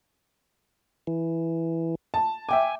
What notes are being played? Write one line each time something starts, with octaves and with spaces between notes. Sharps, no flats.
E3
A5
E5 G5 G#5 D6